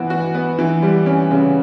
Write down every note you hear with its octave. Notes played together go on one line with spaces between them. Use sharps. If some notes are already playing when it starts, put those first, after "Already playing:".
Already playing: E3 B3 F#4
F#4
B3
E3
G3
C#4
C#3